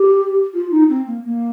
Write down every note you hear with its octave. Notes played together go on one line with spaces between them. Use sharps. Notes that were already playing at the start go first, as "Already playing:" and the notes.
Already playing: G4
F4
D#4
C4
A#3
A#3